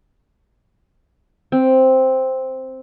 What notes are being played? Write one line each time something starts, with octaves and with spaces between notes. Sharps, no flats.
C4